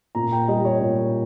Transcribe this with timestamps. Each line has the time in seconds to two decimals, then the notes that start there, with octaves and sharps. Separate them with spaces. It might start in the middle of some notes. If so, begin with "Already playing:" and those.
0.15 A#2 A#5
0.32 G5
0.48 G3 D#5
0.65 C#5
0.81 A#2